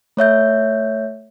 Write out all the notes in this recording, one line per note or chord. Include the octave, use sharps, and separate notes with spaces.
A3 C#5 E5 G6